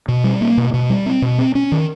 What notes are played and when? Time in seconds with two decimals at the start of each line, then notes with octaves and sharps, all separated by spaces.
0.08 B2
0.24 G3
0.41 A#3
0.57 B2
0.74 B2
0.90 G3
1.06 C4
1.22 B2
1.38 C4
1.55 C#4
1.72 D#3